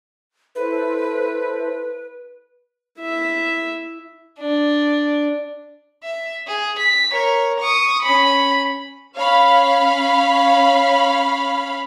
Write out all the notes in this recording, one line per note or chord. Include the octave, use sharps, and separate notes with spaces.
E4 A4 B4 C5
E4 E5
D4
E5
G#4
B6
A#4 C#5
C#6 D#6
C#4 B5
C#4 C#5 F5 B5